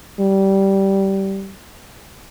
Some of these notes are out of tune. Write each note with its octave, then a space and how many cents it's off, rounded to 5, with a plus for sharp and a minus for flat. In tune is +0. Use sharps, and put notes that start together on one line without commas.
G3 -15